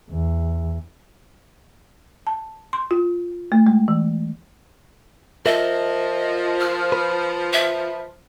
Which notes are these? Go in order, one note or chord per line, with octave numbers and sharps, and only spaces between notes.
E2
A5
C6
F4
A3
G#3
E3
F3 A#4 D#5 E5
F6
B4
E5